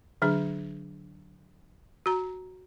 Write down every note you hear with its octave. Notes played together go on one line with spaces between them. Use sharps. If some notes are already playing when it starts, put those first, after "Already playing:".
D3 F#3 D4 G#4
F#4 A#5